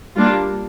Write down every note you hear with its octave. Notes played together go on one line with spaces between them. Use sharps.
G3 A#3 D4 F4